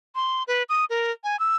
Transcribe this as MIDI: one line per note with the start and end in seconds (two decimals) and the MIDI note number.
0.15 0.43 84
0.48 0.63 71
0.69 0.85 87
0.90 1.11 70
1.24 1.39 80
1.40 1.57 88